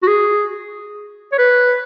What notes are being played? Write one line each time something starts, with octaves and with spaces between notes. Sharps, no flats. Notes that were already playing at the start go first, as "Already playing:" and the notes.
F#4
G#4
C#5
B4